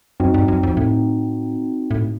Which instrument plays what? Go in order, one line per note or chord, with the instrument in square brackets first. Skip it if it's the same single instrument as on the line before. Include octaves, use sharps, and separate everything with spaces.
[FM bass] F#2 [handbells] C4 D#4 F#4
[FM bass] G2
F#2
F2
A2
A2